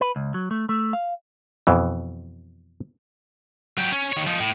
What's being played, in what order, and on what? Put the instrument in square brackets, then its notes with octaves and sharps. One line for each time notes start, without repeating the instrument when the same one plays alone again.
[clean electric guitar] B4
C#2
F#3
A3
A3
F5
[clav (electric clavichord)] F2 B2 E3
[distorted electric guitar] F#3 G4
C#4
D#3 C#5
F3 D#4
A2